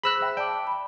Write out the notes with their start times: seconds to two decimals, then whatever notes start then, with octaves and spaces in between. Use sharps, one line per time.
0.03 G#4 C5 B5 E6 F#6 A#6
0.22 E5 G5
0.37 D5 G5 A5 D6
0.67 B5